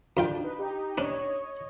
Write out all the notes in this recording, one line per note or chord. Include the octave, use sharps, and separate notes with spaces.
F2 D4 F4 G5
D#4 B4
D#4 G4
C#4 D4 C#5 D#5